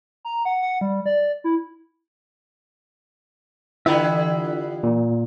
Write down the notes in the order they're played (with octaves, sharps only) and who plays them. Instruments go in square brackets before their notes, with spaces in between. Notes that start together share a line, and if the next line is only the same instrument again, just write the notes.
[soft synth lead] A#5
F#5
F#5
G3
D5
E4
[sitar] D3 G3 B3 [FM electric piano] E3 F4 [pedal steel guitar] E5 B5
[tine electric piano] A#2